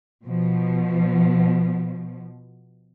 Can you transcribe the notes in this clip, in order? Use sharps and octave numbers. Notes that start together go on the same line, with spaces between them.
B2 F3